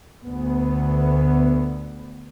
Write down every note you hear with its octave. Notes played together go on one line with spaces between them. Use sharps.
D2 B3